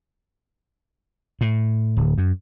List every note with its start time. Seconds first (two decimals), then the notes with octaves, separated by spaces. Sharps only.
1.41 A2
1.97 D1
2.18 F#2